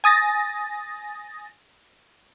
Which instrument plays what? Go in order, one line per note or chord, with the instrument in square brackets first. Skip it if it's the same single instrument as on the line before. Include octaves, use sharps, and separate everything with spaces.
[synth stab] G#5 D#6 A6 A#6